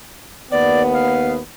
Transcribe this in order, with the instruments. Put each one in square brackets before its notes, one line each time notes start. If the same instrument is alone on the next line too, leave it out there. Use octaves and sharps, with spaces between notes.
[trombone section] D#2 B3 [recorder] D5
[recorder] F5